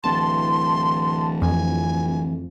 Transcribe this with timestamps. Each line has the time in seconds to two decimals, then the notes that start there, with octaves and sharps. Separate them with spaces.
0.04 D1 E3 A5 C6
1.42 F2 G#5